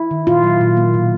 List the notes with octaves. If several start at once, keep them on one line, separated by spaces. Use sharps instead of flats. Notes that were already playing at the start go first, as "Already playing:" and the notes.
Already playing: E4
D#3
A#2 F4
F#3
A#2
A#3
B2